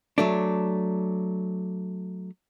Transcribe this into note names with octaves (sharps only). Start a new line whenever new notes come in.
F#3 A3 D4